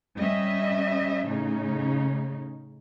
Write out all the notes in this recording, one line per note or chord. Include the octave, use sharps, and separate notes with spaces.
G3 C#4 D#5 E5
A2 C#3 C#4 D#4